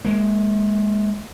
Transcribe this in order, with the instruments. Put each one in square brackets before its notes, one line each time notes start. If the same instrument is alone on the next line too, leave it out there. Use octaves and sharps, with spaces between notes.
[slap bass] G#3 A#3